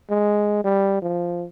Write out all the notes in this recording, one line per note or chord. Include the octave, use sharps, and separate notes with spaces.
G#3
G3
F3